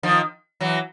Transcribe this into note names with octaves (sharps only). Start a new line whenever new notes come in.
D#3 F3
E3 F#3